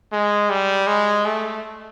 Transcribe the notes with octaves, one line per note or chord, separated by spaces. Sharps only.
G#3
G3
G#3
A3